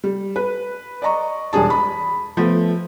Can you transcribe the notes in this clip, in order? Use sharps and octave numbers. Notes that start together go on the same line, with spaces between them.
G3
B4
D5 D#5 A#5 C#6
E1 G3 D4 G#4 A5
B5
F3 A3 B3